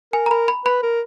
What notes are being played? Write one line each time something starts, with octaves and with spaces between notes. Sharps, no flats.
A#4 G#5
A#5
A#4 B5
B5
B4 B5
A#4